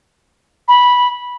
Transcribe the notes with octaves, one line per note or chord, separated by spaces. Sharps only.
B5